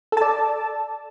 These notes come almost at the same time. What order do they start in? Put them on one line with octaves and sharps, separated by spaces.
A4 A5 D5